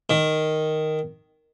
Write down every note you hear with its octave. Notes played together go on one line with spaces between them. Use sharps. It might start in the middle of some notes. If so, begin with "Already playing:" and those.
D#3